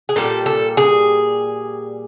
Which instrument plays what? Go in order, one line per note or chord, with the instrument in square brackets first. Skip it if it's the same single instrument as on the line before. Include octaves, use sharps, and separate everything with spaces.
[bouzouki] G#4
A#2 G3 A4
A4
G#4